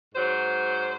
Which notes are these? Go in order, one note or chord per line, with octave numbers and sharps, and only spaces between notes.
G#2 F#3 C5